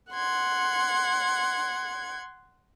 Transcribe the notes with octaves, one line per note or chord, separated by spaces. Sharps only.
F#5 C6 G#6